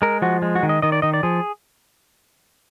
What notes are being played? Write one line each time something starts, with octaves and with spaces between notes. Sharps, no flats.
G#3 A#4
F3 F#4
G#3
F#4
D#3
D#5
D#3 D#5
D5
D#3 D#5
D5
F3 G#4